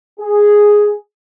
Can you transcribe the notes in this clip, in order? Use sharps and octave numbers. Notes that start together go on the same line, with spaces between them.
G#4